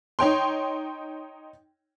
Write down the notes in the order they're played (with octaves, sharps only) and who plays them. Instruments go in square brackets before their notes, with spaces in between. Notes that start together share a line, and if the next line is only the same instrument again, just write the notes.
[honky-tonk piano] D#4 C#5 G5 C6